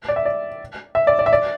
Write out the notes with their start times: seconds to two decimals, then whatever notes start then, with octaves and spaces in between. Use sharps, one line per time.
0.09 D5
0.16 E5
0.25 D5
0.95 E5
1.07 D5
1.19 D5
1.26 E5
1.33 D5